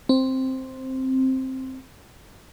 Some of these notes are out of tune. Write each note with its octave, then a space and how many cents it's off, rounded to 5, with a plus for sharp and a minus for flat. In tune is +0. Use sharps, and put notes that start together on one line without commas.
C4 +5